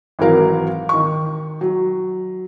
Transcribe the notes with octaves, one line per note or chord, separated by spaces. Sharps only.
G#1 E3 F#3 A#4 F5
D#3 C#6
F#3